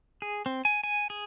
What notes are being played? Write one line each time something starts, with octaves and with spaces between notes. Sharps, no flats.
G#4
C4
G#5
G#5
G#4